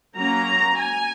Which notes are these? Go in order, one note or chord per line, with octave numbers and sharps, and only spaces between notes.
F#3 A#3 C#4 A#5
G#5